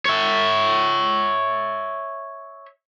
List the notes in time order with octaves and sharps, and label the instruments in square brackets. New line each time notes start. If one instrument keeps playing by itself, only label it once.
[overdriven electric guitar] C#5 E5